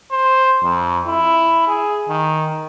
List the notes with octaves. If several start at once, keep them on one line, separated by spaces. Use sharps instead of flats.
C5
F2
E4
G#4
D#3